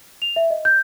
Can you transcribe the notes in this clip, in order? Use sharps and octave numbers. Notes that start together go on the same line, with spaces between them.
F7
E5
D#5
G6